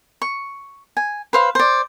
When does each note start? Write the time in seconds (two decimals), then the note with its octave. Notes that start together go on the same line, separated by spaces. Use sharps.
0.22 C#6
0.97 G#5
1.33 B4 C5 F5
1.55 C5 D5